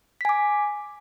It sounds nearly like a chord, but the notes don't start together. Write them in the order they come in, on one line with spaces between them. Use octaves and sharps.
B6 G#5 D6